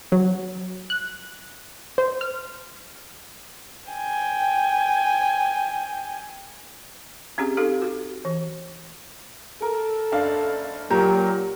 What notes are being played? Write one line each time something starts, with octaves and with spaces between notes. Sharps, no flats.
F#3
F#6
C5
F6
G5 G#5
C4 C#4 G4 G#4
D#4 G4 A4 F5
F#4
E3
A4 A#4
F#1 D4 F5
A#2 F#3 F4 G4 A#4